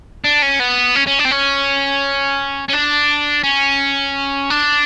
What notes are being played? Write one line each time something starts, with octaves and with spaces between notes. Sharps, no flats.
D4
C#4
B3
C#4
C#4
D4
C4
C#4
C#4
D4
C#4
D4